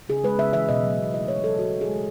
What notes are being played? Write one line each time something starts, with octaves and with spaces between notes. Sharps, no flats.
C#3 G#4
G#3 B4
C#3 E5
E3 E5
B2 D#5
F#3
B2
A3 D#5
B2 C#5
F#3 A4
B2 F#4
G#3
G#4
G#3